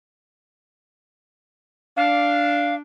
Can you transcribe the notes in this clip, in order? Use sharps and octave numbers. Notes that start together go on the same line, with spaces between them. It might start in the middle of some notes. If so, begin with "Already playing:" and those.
D4 F5